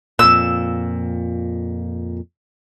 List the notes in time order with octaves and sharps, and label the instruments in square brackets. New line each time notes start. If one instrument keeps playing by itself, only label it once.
[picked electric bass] F2 A#2 [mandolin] E6